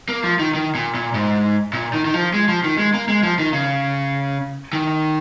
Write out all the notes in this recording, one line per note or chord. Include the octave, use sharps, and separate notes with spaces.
A#3
F3
D#3
D#3
A#2
A#2
G#2
A#2
D#3
D#3
F3
G#3
F3
D#3
G#3
A#3
G#3
F3
D#3
C#3
D#3